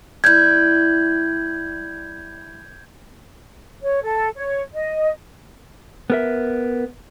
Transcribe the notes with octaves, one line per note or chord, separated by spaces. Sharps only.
G3 E4 G6 G#6
C#5
A4
C#5
D#5
B3 A#4 E5